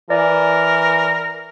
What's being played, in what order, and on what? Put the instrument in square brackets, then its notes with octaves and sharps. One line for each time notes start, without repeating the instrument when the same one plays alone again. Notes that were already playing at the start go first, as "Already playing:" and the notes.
[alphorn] E3 [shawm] A#4 [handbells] D5